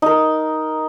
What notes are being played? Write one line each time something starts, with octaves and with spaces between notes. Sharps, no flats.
D#4 A#4